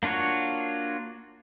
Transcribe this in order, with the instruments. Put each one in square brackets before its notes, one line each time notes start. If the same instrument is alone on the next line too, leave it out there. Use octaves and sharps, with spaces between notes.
[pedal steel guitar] A#3 D4 F4 F#4 C#5